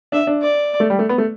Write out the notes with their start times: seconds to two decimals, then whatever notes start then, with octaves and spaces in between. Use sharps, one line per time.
0.12 D4 E5
0.27 D4
0.42 D5
0.80 A3
0.90 G3
0.99 A3
1.09 B3
1.18 A3